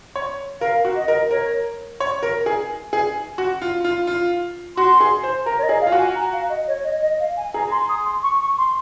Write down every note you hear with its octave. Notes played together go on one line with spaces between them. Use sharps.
C#5
A#4 F5
F#4
D#5
A#4
A#4 C#5
C#5
A#4
G#4
G#4
F#4
F4
F4
F4
F#4 C6
G#4
C5
A#4 A#5
C#5
D#5
G#4
F5
F4
F#4
G#5
A#5
F5
D#5
C#5
D#5
D#5
F5
G#5
G#4 A#5
A#5
C6
D#6
C6
C#6
C#6
C6